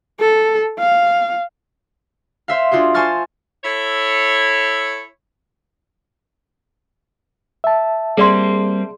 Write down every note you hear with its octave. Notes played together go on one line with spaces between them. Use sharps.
A4
F5
C5 E5 F5
D4 F4 F#4 G#4 C5
C5 G#5 A5 C#6 F6 A6
E4 A4 C#5
E5 A5
G3 A#3 C4 G#4 D5 C6